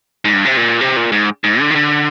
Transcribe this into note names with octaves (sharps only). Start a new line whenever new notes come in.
G#2
G2
C3
A#2
C3
A#2
G#2
G#2
D3
D#3
D3